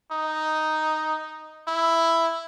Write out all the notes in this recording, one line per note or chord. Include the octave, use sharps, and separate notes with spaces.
D#4
E4